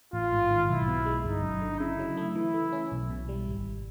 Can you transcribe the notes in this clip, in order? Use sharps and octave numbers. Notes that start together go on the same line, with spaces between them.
A1 F4
G#2
D#3
B1 E4
B2
G#3
G1 D#4
F#2
D3
C#3 E4
F#3
A3
E3 E4
A3
C#4
B1
B2
G3
G#1